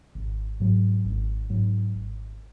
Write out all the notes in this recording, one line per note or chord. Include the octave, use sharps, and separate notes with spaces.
G#1
G#2 F#3
G#1
G#2 F#3
G#1